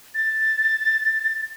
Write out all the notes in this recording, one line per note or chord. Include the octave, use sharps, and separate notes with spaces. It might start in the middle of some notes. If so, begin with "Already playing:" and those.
A6